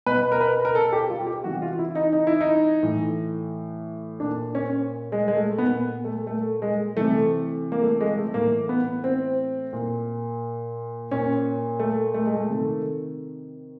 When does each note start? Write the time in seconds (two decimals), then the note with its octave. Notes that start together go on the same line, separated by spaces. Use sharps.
0.06 B2 B4
0.32 A#4
0.41 B4
0.65 A#4
0.75 A4
0.93 G4
1.10 F4
1.27 G4
1.44 C3 E3 F#4
1.62 F4
1.79 E4
1.95 D#4
2.13 D#4
2.27 E4
2.41 D#4
2.83 A2 E3
4.20 A#2 D4
4.55 C#4
5.12 G#3
5.28 G#3
5.35 A3
5.58 A#2 B3
6.04 A3
6.27 A3
6.62 G#3
6.97 C3 E3 A3
7.72 A#3
7.82 A3
8.01 G#3
8.17 A3
8.34 A2 E3 A#3
8.69 B3
9.04 C4
9.73 A#2
11.11 A#2 C#4
11.79 A3
12.14 A3
12.26 G#3
12.35 A3
12.49 C3 D#3